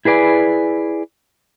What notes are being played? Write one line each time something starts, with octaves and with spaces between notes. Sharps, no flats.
E4 G#4 B4 D5 G#5